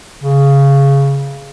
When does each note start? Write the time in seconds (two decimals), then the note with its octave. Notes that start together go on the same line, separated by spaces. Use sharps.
0.24 C#3